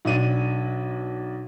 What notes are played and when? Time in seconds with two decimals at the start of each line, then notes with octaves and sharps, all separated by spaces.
0.05 B1 D4 D#7